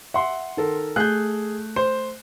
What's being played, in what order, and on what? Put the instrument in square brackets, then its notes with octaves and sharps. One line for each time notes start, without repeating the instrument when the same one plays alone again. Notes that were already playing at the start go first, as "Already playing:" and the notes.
[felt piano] E5 [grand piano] F#5 C6
[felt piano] D#3 A4 A#4
[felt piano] A3 G6 [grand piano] G#4 F#6
[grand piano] C5